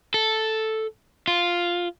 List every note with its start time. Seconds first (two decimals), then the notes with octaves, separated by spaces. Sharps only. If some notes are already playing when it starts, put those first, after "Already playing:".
0.14 A4
1.28 F4